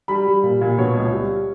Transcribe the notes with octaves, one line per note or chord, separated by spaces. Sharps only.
G3 B5
G3
A#2
A#2
B2 C#5
C#2
G3